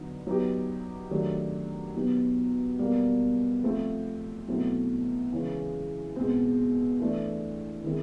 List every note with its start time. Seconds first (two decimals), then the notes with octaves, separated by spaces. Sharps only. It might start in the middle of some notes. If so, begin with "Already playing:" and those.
Already playing: D3 F#3 B3 D#4
0.27 F#3 B3 D#4 G4
1.11 D#3 F#3 A3 D4 G4
1.95 B2 F#3 B3 D#4 G4
2.79 B2 G3 A#3
3.63 F3 A3 C4
4.48 B2 F#3 A3 C4 E4
5.32 C#3 E3 G#3 C#4
6.16 B2 G#3 C4
7.00 E3 A3 D4
7.84 D#3 G#3 C4 E4